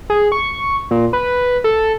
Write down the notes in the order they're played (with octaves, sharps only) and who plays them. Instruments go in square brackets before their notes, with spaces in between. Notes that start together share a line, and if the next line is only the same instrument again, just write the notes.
[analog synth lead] G#4
C#6
A#2
B4
A4